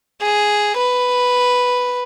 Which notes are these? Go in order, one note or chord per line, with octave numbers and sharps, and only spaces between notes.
G#4
B4